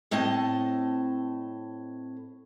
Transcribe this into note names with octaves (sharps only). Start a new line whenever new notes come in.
A2 C4 D#5 A5